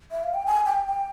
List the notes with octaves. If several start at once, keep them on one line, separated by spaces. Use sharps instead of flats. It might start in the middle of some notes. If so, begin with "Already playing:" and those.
E5
F5
G5
G#5
G5
G5